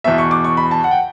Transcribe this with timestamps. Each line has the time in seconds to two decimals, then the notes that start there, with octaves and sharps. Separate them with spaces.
0.04 E2 B2 E5
0.18 C#6
0.31 D6
0.44 C#6
0.57 B5
0.71 A5
0.84 F#5
0.91 G5